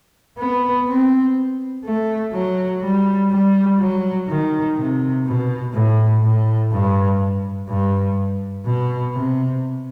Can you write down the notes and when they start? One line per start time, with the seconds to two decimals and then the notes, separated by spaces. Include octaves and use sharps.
0.39 B3
0.88 C4
1.85 A3
2.33 F#3
2.83 G3
3.31 G3
3.79 F#3
4.29 D#3
4.77 C3
5.26 B2
5.74 A2
6.22 A2
6.71 G2
7.69 G2
8.66 B2
9.14 C3